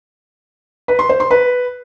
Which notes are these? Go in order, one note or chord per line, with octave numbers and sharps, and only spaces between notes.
B4
C6
C5
C6
B4